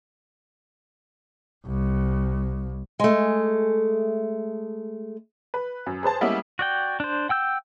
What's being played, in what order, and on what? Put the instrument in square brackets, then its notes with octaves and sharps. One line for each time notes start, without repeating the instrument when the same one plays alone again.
[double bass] C2
[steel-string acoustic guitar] G#3 A3
[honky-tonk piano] B4
F#2
G#4 B4 C5 A5
G3 G#3 A#3 B3 C#4 E4
[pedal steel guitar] F#4 D5 G5
D4 C5
F#5 G5 E6 G6